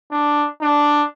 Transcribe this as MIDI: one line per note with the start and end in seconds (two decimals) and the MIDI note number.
0.12 0.48 62
0.62 1.05 62